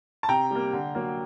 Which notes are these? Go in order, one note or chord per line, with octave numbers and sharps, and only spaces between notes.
A5
C3 G5 A#5
G3 A#3
D3
F#3 A#3